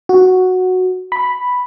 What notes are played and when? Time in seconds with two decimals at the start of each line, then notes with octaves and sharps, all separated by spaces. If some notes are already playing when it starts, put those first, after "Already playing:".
0.09 F#4
1.12 B5